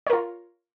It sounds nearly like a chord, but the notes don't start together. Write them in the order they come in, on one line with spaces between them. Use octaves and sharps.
C#5 A#4 F4